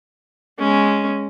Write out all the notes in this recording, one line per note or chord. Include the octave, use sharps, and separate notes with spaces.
G#3 C#4